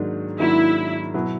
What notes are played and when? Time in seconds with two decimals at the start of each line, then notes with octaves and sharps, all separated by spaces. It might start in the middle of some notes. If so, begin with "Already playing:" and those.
Already playing: G#2 D#3 F#3 A#3 D4
0.39 G#2 D#3 F#3 A#3 D4 E4
1.14 B2 F#3 B3 E4